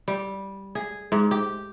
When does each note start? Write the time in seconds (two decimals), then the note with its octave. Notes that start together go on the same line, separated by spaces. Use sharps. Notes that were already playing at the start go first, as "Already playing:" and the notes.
0.08 G3
0.75 G#4
1.12 G#2
1.31 G4